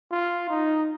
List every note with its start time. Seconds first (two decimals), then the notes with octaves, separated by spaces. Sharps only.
0.12 F4
0.49 D#4